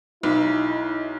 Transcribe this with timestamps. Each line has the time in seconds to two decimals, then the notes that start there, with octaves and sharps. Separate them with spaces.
0.23 B1 D#4 E4